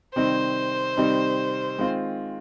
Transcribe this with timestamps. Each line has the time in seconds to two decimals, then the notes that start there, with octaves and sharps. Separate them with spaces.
0.15 C3 D#3 G3 C4 D#4 C5
0.97 C3 D#3 G3 C4 D#4
1.78 D#3 G#3 C4 F4